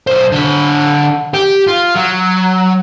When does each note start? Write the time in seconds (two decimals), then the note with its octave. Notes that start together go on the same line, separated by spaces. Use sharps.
0.07 B1 C5
0.32 D3 B5
1.34 G4
1.67 F4
1.95 F#3